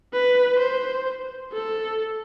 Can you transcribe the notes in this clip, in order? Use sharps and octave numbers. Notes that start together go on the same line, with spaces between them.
B4
C5
A4